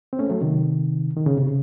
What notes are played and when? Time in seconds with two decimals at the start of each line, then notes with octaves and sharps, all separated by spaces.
0.13 C4
0.19 A3 C#4
0.30 F#3 A3
0.41 C3 D#3
1.17 D#3
1.26 C#3
1.37 C3
1.47 C#3